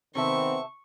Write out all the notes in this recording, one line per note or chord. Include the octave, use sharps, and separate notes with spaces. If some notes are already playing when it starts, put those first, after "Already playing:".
C3 D#3 B3 C4 A4 E5 C#6